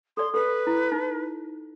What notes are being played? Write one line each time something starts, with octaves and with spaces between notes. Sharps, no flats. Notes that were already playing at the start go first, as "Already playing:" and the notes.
A4 D5 C6
A4 B4
E4
D#4